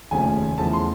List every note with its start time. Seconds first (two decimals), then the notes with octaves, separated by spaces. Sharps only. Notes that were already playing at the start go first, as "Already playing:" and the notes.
0.11 F1 D#2 C#3 F3 A3 G#5
0.58 E2 C#3 F3 A3 A5
0.73 C6